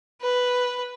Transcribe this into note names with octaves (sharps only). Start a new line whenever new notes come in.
B4